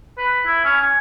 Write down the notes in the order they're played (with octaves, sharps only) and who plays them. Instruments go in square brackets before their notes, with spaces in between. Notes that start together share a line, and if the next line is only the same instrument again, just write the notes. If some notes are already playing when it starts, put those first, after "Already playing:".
[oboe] B4
E4
C#4
G#5